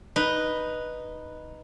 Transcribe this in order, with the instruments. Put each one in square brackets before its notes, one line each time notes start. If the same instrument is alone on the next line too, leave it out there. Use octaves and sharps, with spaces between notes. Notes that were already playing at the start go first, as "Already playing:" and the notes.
[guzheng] D#4 B4